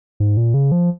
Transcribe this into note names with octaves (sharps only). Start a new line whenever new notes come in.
G#2
A#2
C#3
F3